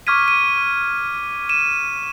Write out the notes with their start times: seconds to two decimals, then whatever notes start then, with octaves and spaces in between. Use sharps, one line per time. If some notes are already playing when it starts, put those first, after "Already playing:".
0.07 C#6 D6 F6 G#6 B6 D#7
0.28 D#7
1.49 D#7 E7